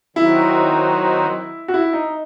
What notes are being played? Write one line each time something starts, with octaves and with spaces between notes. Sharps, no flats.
D#3 F#3 C4 D#4 E4 F#4
F#4
E4
D#4